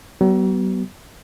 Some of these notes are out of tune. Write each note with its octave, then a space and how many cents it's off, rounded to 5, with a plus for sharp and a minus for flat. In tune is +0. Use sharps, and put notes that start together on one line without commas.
F#3 +45 B3 +0